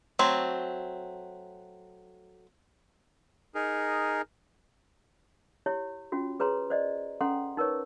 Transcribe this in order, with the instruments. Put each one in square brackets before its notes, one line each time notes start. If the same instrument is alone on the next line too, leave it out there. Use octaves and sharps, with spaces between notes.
[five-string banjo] F#3 A3 C4
[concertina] D#4 G#4 A#4
[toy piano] E4 G4 C#5
C#4 F4 F#4
G#4 B4 C#5 A#5 C6
C5 D5 D#5
C#4 A4 F#5 G5 A#5 C6
D#4 A#4 B4 C#5 C#6